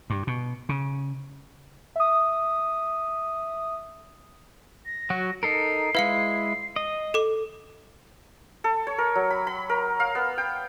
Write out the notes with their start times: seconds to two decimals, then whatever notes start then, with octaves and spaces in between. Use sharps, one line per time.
0.10 G2
0.27 B2
0.69 C#3
1.96 E5 D#6
4.86 A#6
5.10 F#3 F#4
5.43 D#4 A4 A#4 C7
5.95 G#3 E4 B4 F5 C#7
6.76 D#5
7.14 A4 D6
8.64 A4
8.87 C#5
8.98 A#4
9.15 F#3
9.30 B5
9.47 B5
9.69 A#4
10.00 F5
10.15 B3
10.38 G5